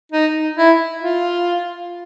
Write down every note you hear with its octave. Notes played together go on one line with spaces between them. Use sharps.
D#4
E4
F4